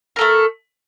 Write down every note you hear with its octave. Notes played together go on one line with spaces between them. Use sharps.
A3 A4 A#4